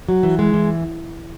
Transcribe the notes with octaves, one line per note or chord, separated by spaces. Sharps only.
F#3
E3
G#3
E3